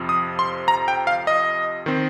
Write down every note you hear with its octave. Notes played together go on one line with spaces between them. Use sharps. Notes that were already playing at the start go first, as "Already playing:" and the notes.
Already playing: F2 C3 F3 C4
D#6
C6
A#5
G5
F5
D#5
D#3 C4